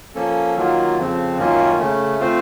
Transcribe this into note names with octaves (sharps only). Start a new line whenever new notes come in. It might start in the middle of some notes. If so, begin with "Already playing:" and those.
F3 A#3 C#4 A4
D#3 F#3 A#3 F4
F2 C#3 F3 C4
F#2 D#3 A#3 C#4 F4
C#3 A3 C#4
A3 C4 F4 C5